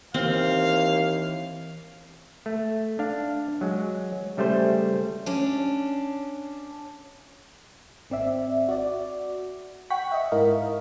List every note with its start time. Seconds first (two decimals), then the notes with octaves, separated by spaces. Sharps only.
0.14 D#2 E3 C4 F5
2.46 A3
2.99 D4 F5
3.61 F#3 G#3
4.37 C#3 G3 A3 G#4 C5
5.26 C#4 D4
8.10 G#1 C4 D5 E5
8.68 F#4 D5
9.90 F#5 G5 C#6 F#6 B6
10.12 D#5 E5
10.32 G#2 E4 A#4 D#5 F5